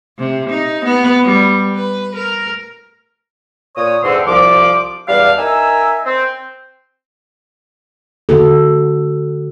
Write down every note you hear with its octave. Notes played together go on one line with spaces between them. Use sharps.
C3
D#4
B3
G3
B4
A#4
A#2 C#5 D#6
E2 G#2 D3 C4 A4 C6
C2 F3 D6
E2 G3 D4 F5
D#4 A#4 E5 G#5 E6
C4
D3 F#4 A4